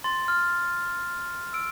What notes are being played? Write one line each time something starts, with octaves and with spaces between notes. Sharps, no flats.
C6 A6
F6
E6 D7